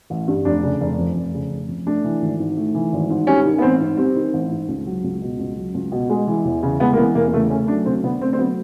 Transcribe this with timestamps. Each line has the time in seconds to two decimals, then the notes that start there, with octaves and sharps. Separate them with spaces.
0.10 A1
0.28 G2
0.45 F1 D4
0.63 C#3
0.81 F1
0.99 F2
1.16 F1
1.34 C#3
1.51 F1
1.69 F2
1.86 A3 D4
2.04 E3
2.21 G#1
2.39 G#2
2.57 A3
2.75 E3
2.92 G#1
3.10 G#2
3.27 G3 C#4
3.45 D#3
3.58 B3
3.62 A1 C4
3.80 G#2
3.97 G3 C4
4.16 D#3
4.33 A1
4.51 G#2
4.68 C#2
4.86 F#3
5.04 C#2
5.22 B2
5.39 C#2
5.57 F#3
5.74 C#2
5.92 B2
6.10 G#3
6.27 E3
6.45 E2
6.63 C#3
6.80 G#3 B3
6.93 A#3
6.97 E3 B3
7.15 E2 A#3
7.27 A#3
7.33 C#3 A3
7.50 A3 C#4
7.68 F#3 D4
7.86 D2 C4
8.03 D3 B3
8.21 A3 C4
8.33 C4
8.39 F#3 B3